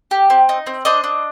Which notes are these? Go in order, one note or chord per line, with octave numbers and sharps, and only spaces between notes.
G4
C4
D#4
C4
D4 C5 D#5
D4